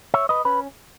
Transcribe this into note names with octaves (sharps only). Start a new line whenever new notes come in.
C#5 E5
B4 D#5
C#4 B4